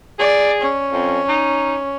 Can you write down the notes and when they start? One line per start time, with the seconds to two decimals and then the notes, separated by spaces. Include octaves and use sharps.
0.19 G#4 D5
0.62 C#4
0.92 F2
1.29 D#4